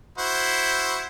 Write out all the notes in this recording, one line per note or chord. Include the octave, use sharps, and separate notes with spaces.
E4 F#4 C5